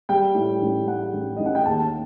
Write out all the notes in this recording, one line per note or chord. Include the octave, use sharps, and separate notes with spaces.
G3 G5
A2
A1
A2 F#5
A1
A1 D#5
F#5
G5
D#2 A5